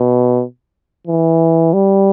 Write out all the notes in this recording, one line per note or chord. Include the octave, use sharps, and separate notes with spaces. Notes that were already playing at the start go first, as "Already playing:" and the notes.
Already playing: B2
E3
G3